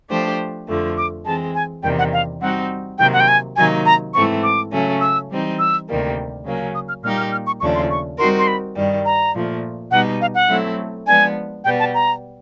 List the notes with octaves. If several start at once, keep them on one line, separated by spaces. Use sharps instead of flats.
F3 A3 D4 G4 C5
F2 D3 F3 A3
D6
E3 G#3 C4 A5
G#5
E2 C3 D#3 G3 A#3 G5
F#5
F5
G3 C4 D#4 F#4 F#5
C3 D#3 F#3 A#3 G5
F#5
G5
G#5
C3 D#3 F#3 A#3 D#4 G#5
A#5
G#2 E3 A3 C4 C#6
D6
C#3 F#3 A3 C#4
E6
E3 G3 C4 D#4
E6
D2 C3 D#3 G3 A#3
C#3 F#3 A#3 C#4
D#6
F6
A#2 G3 A#3 D#4 G4 F6
F6
F6
C#6
D#2 C#3 F3 A3 D4 C#6
C6
C#6
G3 C4 D#4 F#4 A#4 C6
C6
B5
G2 D#3 G3
A#5
A#2 F3 A3
B2 G3 B3 D#4 F#5
F5
F#5
F#3 A3 C4 E4 A4
F3 G#3 B3 D4 G#5
B2 G3 B3 G5
A5
A#5